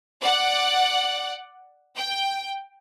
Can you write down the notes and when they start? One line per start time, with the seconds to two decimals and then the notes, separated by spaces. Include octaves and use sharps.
0.21 D5 F#5
1.95 G5